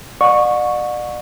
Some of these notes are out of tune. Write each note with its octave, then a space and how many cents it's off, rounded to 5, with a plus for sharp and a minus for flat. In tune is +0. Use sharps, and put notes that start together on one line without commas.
D5 +40 F#5 -40 C#6 +0